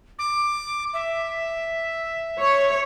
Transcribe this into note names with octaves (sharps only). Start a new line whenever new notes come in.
D6
E5
C#5